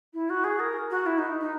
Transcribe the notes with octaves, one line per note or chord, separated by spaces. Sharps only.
E4
F#4
G#4
A#4
F#4
E4
D#4
D#4